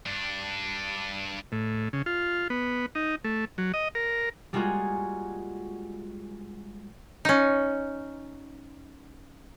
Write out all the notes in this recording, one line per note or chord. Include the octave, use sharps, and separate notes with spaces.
G2 D4
A2
C#3
F4
B3
D#4
A3
F#3
D#5
A#4
G3 G#3 A#3 F4 F#4 G#4
C#4 D#4